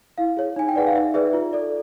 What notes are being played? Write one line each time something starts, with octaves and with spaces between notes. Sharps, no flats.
E4 F5
G#4 C#5
D#4 G#5
G5
G#4 B4 D5 F#5
F5
D#4 E5
G#4 B4 D5 E5
F4
A4 D5